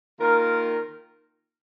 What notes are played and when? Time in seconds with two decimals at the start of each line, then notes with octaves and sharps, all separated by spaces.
0.19 D#3 A#3 F4 A#4